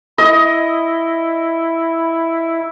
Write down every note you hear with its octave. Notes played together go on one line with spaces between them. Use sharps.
E4 D#5